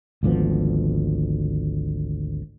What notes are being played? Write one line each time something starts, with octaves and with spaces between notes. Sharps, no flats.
G#1 D2 F3 B3